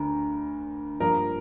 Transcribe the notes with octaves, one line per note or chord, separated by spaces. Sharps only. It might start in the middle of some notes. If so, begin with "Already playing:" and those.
Already playing: D2 D3 A#4
G2 F3 A#3 A#4